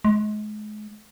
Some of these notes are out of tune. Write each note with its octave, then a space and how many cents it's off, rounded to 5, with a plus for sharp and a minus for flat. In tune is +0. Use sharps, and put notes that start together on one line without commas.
G#3 +35